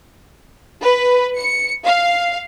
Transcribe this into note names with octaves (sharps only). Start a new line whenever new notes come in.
B4
C#7
F5